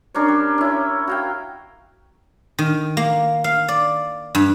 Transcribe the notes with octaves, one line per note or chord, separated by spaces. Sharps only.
C#4 D4 A#4 C#5
G3
C#4 E4
F#4 F5 G5
D#3
A#3
F5
D5
G2